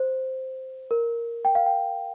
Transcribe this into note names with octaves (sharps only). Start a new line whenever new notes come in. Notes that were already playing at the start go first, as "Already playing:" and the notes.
Already playing: C5
A#4
G5
F5
G5